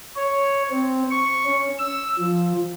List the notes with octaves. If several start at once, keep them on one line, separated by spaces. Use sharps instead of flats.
C#5
C4
C#6
C#4
E6
F3